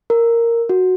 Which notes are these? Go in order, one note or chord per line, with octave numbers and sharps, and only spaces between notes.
A#4
F#4